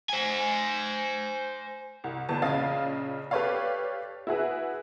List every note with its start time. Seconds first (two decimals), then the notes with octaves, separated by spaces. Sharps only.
0.10 C5 G#5
2.04 C2
2.29 G1 E2 A5
2.42 A#1 C#3 D#5 F5 A6
3.31 G4 A4 B4 C#5 D5 F5
4.27 E4 F#4 G#4 B4